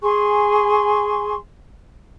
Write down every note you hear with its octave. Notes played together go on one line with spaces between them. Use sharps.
G#4 G#5 C6 C#6